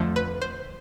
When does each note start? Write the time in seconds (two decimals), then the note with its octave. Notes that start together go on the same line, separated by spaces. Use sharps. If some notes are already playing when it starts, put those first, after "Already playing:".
Already playing: F2 D3 F3 A3
0.16 B4
0.42 C5